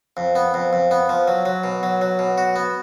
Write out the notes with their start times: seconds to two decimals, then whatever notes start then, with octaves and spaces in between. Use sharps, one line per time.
0.17 F2
0.35 B3
0.54 F2
0.73 F2
0.91 B3
1.09 F3
1.28 F#3
1.46 F#3
1.64 B2
1.83 F#3
2.01 F#3
2.19 B2
2.38 F#4
2.56 B3